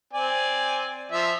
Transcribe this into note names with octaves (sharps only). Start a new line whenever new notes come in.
C4 D5 G#5
F3 E5